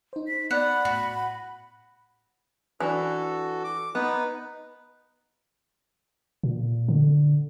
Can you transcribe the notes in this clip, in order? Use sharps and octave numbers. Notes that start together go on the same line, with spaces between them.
D#4 C5
B6
B3 D5 F#5 B5 A6
A2 F#4
E3 D4 F#4 A4
D6
B3 D#4 B4
A#2
D3